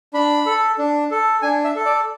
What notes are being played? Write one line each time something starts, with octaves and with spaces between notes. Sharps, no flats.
D4 B5
A4
D4
A4
D4 G#5
E5
A4
D5